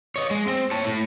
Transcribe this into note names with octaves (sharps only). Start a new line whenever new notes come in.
C#5 D#5
G#3
C4
C#5 A5
A2